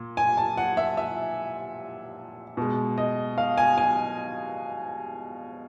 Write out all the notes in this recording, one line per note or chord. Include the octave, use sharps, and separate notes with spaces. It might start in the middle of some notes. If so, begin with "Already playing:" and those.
Already playing: A#2
G#5
A5
F#5
E5
E5
B2 G#3
D#5
F5
G#5
G#5